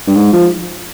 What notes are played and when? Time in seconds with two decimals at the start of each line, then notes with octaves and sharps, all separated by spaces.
0.07 G2
0.16 G#2
0.33 F3